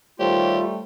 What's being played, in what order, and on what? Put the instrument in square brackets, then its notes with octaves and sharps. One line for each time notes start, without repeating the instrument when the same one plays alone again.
[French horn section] D#3 C5 C#5 [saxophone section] G3 A3 [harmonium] F4 [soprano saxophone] G4